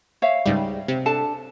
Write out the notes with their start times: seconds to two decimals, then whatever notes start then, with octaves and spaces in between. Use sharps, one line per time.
0.22 C#5 E5 F5
0.46 C#2 G#2 G3
0.88 C3
1.06 D4 A4 A5